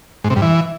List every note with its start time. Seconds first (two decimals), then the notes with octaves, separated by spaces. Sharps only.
0.24 G#2
0.30 C3
0.36 G2
0.42 E3